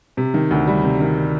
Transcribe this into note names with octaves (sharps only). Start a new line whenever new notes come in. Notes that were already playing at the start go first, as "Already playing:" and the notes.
C3
D#3
D2
G3
C3
D#3